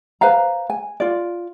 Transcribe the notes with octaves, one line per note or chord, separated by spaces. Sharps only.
B4 C5 F5 A#5
G#5
F4 D5